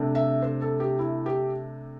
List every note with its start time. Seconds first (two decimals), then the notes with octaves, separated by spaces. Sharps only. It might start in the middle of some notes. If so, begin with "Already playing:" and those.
Already playing: C3 A3 D4
0.15 E5
0.42 C5
0.61 A4
0.80 G4
0.99 E4
1.26 G4